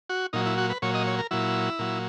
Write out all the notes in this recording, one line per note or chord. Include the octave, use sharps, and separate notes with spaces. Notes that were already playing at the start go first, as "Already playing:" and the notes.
F#4
A#2 F#3 D#4
E4
F#4
B4
A#2 F#3 C#5
D#5
C#5
A#4
A#2 F#3 E4
A#2 F#3